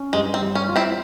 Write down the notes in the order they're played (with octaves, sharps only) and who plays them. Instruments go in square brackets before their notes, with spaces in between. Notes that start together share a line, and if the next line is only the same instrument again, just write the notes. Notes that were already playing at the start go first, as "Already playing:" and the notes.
Already playing: [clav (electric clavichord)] C#4
[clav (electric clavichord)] G2 [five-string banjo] G#3
[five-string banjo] C4
[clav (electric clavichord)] G3
[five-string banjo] C#4
[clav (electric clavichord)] F4
[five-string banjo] C4 E4